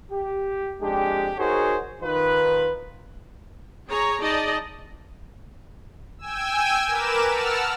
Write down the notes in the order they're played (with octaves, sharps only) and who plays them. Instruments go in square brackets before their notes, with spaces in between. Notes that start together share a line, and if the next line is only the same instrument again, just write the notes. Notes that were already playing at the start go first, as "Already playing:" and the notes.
[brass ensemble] G4
F2 G#3 D4 G4
D#4 F#4 G#4 A#4 C5 C#5
D#3 D#4 F4 B4
[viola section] G#4 C#5 A#5
D#4 G#4 D5 D#5 A5
[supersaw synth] G5 G#5 E6
A#4 B4 D6 E7
F#5 A5 E6 F6